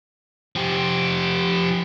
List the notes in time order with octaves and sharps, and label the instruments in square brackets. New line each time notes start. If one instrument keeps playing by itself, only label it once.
[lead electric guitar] F3 G4